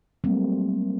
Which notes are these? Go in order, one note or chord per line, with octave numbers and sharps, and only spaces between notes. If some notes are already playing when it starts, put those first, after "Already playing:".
F#3 G3 A3 A#3 C4